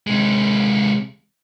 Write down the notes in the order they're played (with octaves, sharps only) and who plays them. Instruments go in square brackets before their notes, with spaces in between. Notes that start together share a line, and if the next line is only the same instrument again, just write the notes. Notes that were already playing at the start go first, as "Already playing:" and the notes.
[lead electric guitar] C3 G#3